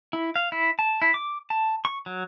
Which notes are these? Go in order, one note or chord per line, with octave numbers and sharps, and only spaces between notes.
E4
F5
E4
A5
E4
D6
A5
C#6
F#3